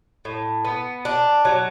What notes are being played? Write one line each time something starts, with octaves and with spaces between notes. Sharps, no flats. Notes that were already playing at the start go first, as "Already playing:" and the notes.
A2
B3
D4
F#3